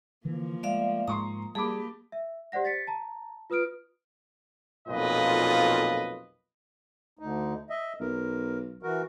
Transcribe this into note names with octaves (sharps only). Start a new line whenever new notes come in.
D3 E3 F3 A#3
G#3 A3 D5 E5 F5
G#2 G#3 A#5 C6 C#6 D#6
G3 A#3 G4 G#4 A5 B5 D6
E5
G4 C5 D5 F#5 A#6
A6 B6 C#7
A5 A#5
F4 B4 D#6 F6 D7
B1 F2 A#2 F4 B4 D#5
D2 D#4
D#5 E5
B1 A#4
E3 F#4 A#4